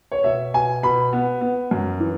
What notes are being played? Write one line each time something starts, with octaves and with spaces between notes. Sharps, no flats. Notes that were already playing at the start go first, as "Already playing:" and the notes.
C#5
B2 E5
B2 G#5
B2 B5
B3
B3
F#2
E3